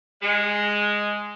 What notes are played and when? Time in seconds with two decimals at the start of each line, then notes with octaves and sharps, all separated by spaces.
0.23 G#3